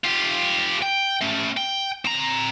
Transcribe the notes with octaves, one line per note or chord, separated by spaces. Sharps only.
F4 G4
G5
A3 C#4
G5
C4 A#5